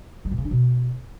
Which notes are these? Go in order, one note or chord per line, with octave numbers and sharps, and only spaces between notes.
G3
A#2
C#3
D4
B2